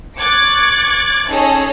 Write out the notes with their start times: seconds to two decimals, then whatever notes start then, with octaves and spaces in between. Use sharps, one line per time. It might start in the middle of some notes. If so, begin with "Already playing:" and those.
0.18 C#6 D6 F#6 G#6 A6 C#7
1.29 C#4 D#4 G#4 A4 C#5